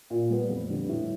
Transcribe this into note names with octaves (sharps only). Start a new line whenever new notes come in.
A#2
G3 B3
F2
D3 G3
A2